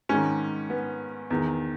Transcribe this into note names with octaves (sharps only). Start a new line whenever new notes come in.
G#2 D#3 C#4
B3
E2 D#3